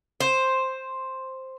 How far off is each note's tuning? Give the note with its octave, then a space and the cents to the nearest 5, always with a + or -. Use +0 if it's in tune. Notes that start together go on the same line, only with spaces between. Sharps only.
C5 +5